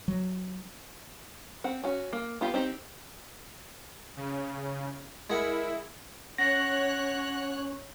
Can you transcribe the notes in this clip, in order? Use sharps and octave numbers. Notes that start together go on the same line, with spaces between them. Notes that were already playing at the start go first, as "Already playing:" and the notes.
F#3
C4 F#5
C#4 F#4
A#3
B3 F4 G4
C4 D#4 G4
C#3
G#3 E4 A#4 F#5
C#4 C#5 F#5 F#6 A#6